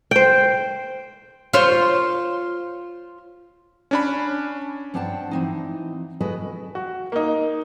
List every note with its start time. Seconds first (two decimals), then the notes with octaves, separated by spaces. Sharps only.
0.11 C5 G5
1.54 F4 C5 C#5
3.91 C#4 D4 B5
4.94 G2 C4 D4 F#5 G5 A5
5.31 E3 C4 D#4
6.21 G#3 F#4 A4 B4 D#5
6.75 F#4
7.12 A#3 D#4